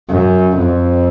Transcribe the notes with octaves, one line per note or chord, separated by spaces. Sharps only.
F#2
F2